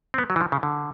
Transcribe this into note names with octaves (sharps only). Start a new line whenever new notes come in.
C4
B3
F#3
E3
F3
C#3
D3